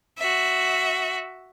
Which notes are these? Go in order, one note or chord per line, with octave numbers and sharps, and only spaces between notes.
F#4 E5